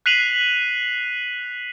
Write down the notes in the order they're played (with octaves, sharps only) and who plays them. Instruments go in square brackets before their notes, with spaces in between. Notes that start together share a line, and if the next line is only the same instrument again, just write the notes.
[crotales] F#6 B6 C7 D#7 F7 F#7